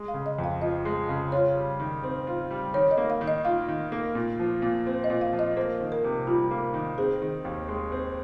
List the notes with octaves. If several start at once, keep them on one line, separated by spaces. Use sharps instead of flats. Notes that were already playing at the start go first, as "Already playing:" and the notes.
Already playing: G#3
F5
C#3
D#5
F2
F5
F3 D#5
G#3
C#3
F4 C#5
G3
D#3
C4
F4
G3
D#3 C#5
D#5
A#3
F5
D#3
D#5
F4 F5
D#3
A#3
A#2
F3
A#2
C4
D#5
A#2
F5
F3
D#5
A#3 C5
D#3
A#4
C3
G3 F4
A#3
D#3
C4 G#4
D#3
D#2
G#3
C4